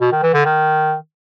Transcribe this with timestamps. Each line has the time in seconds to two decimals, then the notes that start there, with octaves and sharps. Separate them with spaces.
0.01 B2
0.12 D#3
0.23 E3
0.34 D3
0.45 D#3